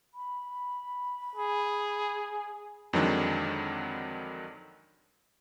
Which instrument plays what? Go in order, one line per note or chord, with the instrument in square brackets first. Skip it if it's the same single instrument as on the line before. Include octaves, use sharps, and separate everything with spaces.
[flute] B5
[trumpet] G#4
[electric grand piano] F2 D3 D#3 F#3 G#3 D4